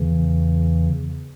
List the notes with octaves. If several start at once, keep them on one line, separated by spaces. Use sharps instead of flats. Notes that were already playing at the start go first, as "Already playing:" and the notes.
Already playing: E2 C#3 E3